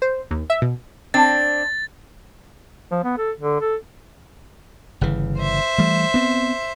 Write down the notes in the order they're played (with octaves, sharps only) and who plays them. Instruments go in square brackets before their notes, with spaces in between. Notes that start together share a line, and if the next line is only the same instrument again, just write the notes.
[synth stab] C5
D#2
E5
B2
[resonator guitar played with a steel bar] C4 D4 [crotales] A6
[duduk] F3
B3
A4
D3
A4
[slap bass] G1 C#3 E3
[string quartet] C5 E5
[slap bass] E3 G3 A3
B3 C4